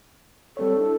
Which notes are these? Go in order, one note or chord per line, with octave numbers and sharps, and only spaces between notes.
G3 C4 A4 C#5
D4 E4